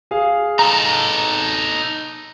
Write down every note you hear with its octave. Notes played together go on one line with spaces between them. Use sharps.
G#4 F5
D#4 A4 A#5